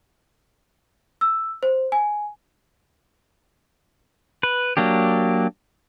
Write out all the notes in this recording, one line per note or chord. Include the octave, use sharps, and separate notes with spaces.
E6
C5
G#5
B4
F#3 A#3 D4 G4